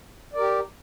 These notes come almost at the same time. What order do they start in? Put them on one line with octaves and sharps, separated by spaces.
D5 A#4 G4